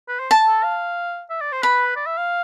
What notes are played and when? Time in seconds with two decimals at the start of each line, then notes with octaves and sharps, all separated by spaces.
0.09 B4
0.20 C5
0.31 A5
0.47 A4
0.64 F5
1.30 E5
1.41 D5
1.52 C5
1.63 B4 B5
1.96 D5
2.07 E5
2.18 F5